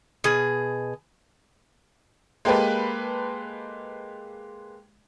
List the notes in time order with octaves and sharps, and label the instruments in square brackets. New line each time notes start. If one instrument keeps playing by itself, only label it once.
[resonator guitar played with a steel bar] B2 G#4
[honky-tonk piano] G#3 A#3 G4 A4 B4